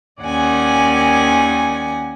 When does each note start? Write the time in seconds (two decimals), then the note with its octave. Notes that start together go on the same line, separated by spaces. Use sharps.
0.22 D#2 D#3 C#4 D5 F#5 G#5